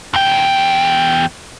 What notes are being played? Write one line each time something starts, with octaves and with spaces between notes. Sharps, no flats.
E2 G5